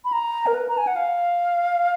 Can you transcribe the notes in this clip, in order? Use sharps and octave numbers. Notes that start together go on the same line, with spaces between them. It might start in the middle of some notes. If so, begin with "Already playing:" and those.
B5
A#5
A#4
B4
A#5
G#5
F#5
F5